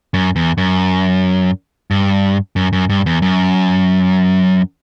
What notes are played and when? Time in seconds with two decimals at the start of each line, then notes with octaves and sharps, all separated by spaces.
0.14 F#2
0.36 E2
0.58 F#2
1.91 G2
2.56 F#2
2.73 F#2
2.89 G2
3.06 E2
3.22 F#2